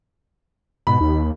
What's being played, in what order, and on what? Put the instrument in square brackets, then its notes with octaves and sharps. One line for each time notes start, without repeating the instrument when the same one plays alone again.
[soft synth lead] G#2 [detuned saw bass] B2 [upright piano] B5
[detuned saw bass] D#2 [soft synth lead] D#4